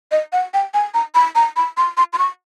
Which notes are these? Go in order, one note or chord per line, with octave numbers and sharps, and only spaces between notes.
D#5
F#5
G5
G#5
A#5
B5
A#5
B5
C6
C6
C6
C#6